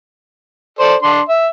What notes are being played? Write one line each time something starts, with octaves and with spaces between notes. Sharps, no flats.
A4 C5 D5
D4 C6
E5